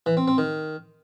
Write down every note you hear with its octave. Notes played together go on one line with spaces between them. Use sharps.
E3
C4
C4
D#3